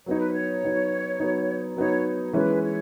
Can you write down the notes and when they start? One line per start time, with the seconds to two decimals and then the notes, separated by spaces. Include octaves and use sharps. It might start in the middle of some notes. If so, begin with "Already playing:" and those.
0.06 F#3 B3 D#4 C#5
0.19 B4
0.32 C#5
0.63 F#3 B3 D#4
1.20 F#3 B3 D#4
1.77 F#3 B3 D#4 C#5
2.33 E3 G#3 C#4 E4 B4
2.62 C#5